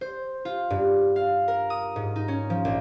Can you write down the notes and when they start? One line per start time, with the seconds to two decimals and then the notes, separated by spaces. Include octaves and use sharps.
0.01 C5
0.45 F4
0.70 G2
1.16 F5
1.48 A#4
1.70 D#6
1.96 G#2
2.16 D#4
2.28 C#4
2.50 F3
2.65 A#1